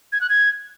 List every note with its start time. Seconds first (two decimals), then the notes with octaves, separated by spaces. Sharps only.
0.12 G#6
0.21 F#6
0.30 G#6